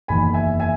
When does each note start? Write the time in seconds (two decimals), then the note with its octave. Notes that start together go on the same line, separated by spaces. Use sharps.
0.08 F#1 E2 D#3 G#5 B5
0.34 E5 G#5
0.60 E5 G#5